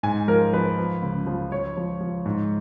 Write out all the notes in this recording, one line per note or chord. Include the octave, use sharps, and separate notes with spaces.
G#2 G#5
F3 A#4
F3 B4
F3
C#2
F3
F3 C#5
F3
F3
G#2